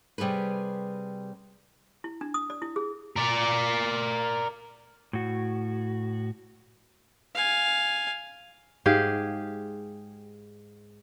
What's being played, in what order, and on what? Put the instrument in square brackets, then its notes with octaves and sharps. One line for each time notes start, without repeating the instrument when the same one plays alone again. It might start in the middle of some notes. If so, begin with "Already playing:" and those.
[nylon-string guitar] C3 G3 G#4 A4 B4
[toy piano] E4
D4
D#6
D5
E4
G#4
[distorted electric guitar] A#4 D5
[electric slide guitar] A2 F#4
[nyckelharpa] F5 G#5
[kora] G#2 G4 G#4 F5